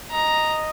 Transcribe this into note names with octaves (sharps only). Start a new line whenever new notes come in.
D#5 A#5